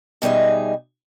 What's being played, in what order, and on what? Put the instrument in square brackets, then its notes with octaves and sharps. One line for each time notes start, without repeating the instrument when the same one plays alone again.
[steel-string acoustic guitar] B2 G3 D#4 G#4 E5